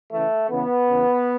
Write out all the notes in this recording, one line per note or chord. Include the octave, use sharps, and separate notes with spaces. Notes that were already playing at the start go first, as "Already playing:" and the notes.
C#3 E3 A3
C#3 E3 B3
C#3 E3